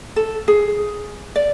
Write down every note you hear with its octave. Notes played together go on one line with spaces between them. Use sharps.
A4
G#4
D5